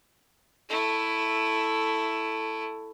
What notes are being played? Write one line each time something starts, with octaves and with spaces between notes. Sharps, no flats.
A3 E4